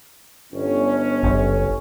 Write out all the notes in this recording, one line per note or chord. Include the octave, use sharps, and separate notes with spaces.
G1 C#4
F#1